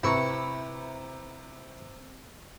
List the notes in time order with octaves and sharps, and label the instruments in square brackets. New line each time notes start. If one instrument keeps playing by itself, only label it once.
[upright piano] C3 A#5 [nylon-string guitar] C4 B4 [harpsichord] E4 C#6